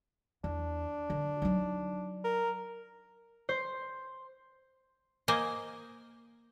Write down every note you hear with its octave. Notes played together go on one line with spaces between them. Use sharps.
E2 D4
D3
F#3 D#4
A#4
C5
A#3 C5 D#5 G#5